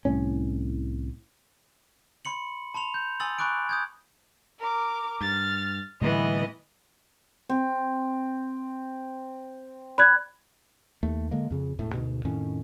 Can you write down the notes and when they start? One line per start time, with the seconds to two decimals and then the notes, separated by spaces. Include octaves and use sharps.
0.05 C2 A2 C#4
2.25 B5 C6 C#7 F#7
2.74 A5 B5 C6 F7
2.94 G6
3.20 G#5 C6 D#6 E6 A6 F#7
3.39 G#5 B5 C#6 D6 F#6 D7
3.69 D#6 G6 G#6
4.59 A#4 D6
5.21 G2 F6 A6
6.01 A2 D3 E3 G3 B3 D#5
7.49 C4
9.98 D5 B5 F#6 G#6
11.03 D#2 A3
11.31 D3 G#3 A#3
11.51 F2 C#3
11.79 E1 A2 A3
11.94 D2 G#2 B2
12.25 F2 A2 D#3 C#4